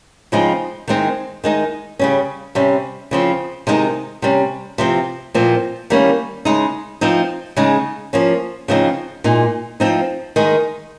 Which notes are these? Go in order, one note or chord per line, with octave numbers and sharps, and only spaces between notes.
C#3 F3 G#3 C4 D#4
D#3 G#3 C4 D#4
D#3 G#3 D#4
C#3 G3 C#4
C3 G3 C#4
C#3 F3 C4
C3 D#3 G#3 C4 D#4
C3 G3 C#4
C3 F3 C4
A#2 F3 C4
D#3 G3 A#3 C#4
C#3 G#3 D#4
F3 C4 D#4
C#3 G#3 D#4
F3 A#3 C#4
C#3 F3 C4 D#4
A#2 G#3 D#4
F3 C4 D#4
D#3 G#3 D#4